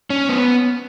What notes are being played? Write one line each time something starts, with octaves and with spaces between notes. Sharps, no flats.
C#4
B3